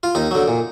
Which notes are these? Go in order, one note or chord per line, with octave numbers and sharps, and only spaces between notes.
F4
D#2 D#4
D3 F#3
A#2